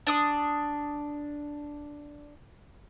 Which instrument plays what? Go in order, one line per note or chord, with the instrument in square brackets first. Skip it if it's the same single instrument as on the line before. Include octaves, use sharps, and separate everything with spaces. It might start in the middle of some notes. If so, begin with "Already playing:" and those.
[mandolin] D4 D#6